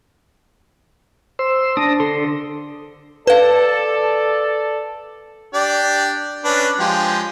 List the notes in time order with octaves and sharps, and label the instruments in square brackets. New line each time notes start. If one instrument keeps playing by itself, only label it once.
[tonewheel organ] C5 C6 E6
[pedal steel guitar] D4 [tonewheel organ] D#6 A#6
[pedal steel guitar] D3 C6 [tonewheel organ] A4
[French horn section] A4 D5 [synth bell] B4 F5
[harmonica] D4 G4 D5
C#4 D4 B4
F3 G#3 G4